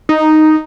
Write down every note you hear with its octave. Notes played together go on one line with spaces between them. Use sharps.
D#4